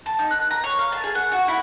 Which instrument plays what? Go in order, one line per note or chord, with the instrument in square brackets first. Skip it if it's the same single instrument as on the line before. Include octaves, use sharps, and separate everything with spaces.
[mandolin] A5
D#4
F#6
A#5
C#5
F5
A5
G#4
F#5
F#4
E4